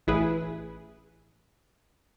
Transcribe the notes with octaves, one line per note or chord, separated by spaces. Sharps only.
A1 E4 G#4 B4